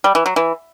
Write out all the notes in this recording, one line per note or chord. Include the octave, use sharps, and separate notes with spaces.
G3
E3
F#3
E3